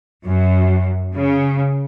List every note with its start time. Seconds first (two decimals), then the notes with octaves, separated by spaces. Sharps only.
0.25 F#2
1.16 C#3